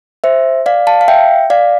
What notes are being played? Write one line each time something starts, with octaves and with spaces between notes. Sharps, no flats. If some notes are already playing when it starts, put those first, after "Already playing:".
C5 E5
D5 F5
F5 A5
F5
E5 G5
D5 F5